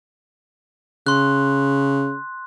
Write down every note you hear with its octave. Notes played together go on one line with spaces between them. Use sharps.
C#3 C6 F#6